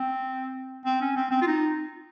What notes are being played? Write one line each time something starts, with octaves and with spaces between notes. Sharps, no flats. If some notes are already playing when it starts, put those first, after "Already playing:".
Already playing: C4
C4
C#4
C4
C4
F4
D#4